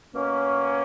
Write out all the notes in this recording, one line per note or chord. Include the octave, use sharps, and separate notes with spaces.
B2 A#3 C#4